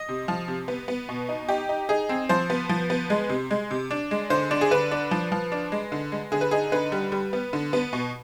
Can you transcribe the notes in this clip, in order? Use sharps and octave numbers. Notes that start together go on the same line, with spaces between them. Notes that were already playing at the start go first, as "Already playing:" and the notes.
Already playing: D#5
C3
F3
C3
B3
B3
B2
D#4
D#4 G4
D#4
D#4 G#4
C4
F3 C5
B3
F3
B3
G#3
C3
G#3
C3
D4
G#3
D3 C5
D4
G#4
D3 B4
D4
F3
F3
D4
G#3
D3
G#3
D3 G#4
B4
D#4 G#4
D3 B4
G3
G3
B3
D3
B3
B2